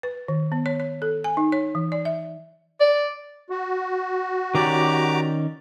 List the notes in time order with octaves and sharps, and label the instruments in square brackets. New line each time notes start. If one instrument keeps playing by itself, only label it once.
[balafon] B4
D#3
B3
C#5
C#5
A4
G#5
D#4
C#5
E3
D5
E5
[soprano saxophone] D5
[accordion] F#4
[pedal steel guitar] D#3 C#4 D5 [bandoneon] G4 A#5 D6